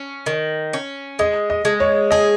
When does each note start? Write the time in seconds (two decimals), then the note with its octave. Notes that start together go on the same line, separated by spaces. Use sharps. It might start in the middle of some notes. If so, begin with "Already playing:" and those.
Already playing: C#4
0.26 D#3
0.73 C#4
1.19 G#3 D#5
1.50 D#5
1.65 G#3
1.80 C#5
2.11 G#4 D#5